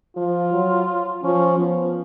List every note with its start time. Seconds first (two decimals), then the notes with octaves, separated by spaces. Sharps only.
0.16 F3 F4
0.52 F#3
1.23 F3 C#4
1.59 F3 B3